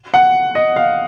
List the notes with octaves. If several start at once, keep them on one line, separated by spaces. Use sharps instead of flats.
F#5
D#5
F5